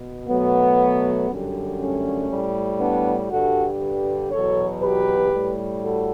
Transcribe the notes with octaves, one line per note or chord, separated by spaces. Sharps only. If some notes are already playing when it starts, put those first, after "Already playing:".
Already playing: B2
B2 F#3 A3 B3
F#2 D3 G3
A3 C#4
A2 G3
B3 D4
G2 D3 G3 F#4 A4
G4 B4
E2 B2 F#3 A4 C#5
G4 B4
A2 G3
F#4 A4